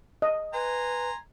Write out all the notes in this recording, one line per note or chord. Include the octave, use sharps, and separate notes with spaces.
D#5
B4 G#5 A#5 C6